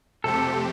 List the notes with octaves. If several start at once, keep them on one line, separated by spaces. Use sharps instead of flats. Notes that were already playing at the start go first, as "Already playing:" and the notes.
F2 C3 A3 C4 G4 A4